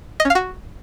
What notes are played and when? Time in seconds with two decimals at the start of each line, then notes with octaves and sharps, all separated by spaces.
0.20 D#5
0.25 C#4
0.30 F5
0.35 F#4